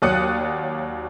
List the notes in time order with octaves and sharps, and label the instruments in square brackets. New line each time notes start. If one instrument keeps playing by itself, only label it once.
[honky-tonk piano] D#2 F#3 D5 D#6 F#6 C#7